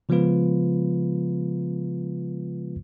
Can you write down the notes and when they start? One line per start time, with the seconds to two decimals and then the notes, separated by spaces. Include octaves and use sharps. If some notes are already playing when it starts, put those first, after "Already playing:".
0.09 C#3 F3 G#3 B3 F4 B4